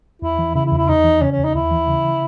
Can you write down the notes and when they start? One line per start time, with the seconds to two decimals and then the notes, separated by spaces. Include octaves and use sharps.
0.22 E2 E4
0.39 E3
0.55 C#3 E4
0.66 E4
0.72 E2
0.77 E4
0.88 E2 D#4
1.04 E3
1.22 C#3 C#4
1.32 C#4
1.38 E2
1.44 D#4
1.54 D#2 E4
1.71 E3
1.87 C#3